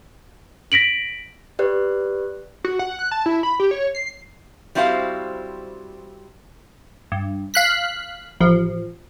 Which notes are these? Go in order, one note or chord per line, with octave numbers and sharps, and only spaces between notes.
A#6 B6 D7 F#7
G4 B4 D5 F#6
F#4
F#5
F#6
A5
E4
B5
G4
C#5
C7
G3 C4 E4 F#4 C5 F5
G2
F5 F#6 B6
A1 F3